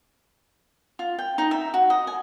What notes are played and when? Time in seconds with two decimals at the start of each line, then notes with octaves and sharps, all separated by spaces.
0.99 F4
1.18 G5
1.38 D#4
1.51 E5
1.74 F#4
1.90 D#5
2.07 G#5